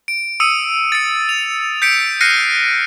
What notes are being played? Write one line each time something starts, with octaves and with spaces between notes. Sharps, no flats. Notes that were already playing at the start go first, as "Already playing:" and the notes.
D7
D#6 E6 C#7 D#7
A6 C#7
F7
G6 B6 C#7 D7
F6 F#6 A#6 C7 C#7 D#7